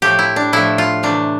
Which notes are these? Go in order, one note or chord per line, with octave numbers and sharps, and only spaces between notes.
A2 F3 A3 G4
E4
D4
A2 F3 A3 E4
F4
C3 E3 A3 D4